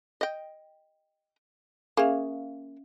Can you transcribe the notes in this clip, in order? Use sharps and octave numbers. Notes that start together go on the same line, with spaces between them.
D#5 G5
A#3 C#4 G#4 E5 F5